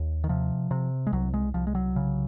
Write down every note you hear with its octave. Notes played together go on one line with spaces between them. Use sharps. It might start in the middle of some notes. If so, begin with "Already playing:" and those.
Already playing: D#2
D#3
C3 F3
C3
G#3
C2 F#3
G#3
C2 F3
G#3
F#3
C#3